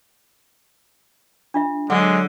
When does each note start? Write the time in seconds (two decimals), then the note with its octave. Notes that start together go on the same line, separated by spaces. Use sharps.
1.54 D4 F4 E5
1.90 D3 F#3 G#3 G#4 E5